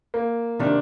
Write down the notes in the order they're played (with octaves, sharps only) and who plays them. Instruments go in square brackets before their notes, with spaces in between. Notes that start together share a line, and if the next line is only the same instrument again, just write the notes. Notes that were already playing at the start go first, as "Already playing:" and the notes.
[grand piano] A#3
[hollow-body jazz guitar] C3 D#3 [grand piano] D4